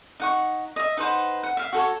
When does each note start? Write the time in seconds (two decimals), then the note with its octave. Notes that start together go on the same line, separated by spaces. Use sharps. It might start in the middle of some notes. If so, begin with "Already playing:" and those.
0.20 D#4 F#5 C#6
0.76 D#5 E5
0.97 D#4 B4 C5 F#5
1.43 F#5
1.57 E5 F5
1.73 F#4 A4 C#5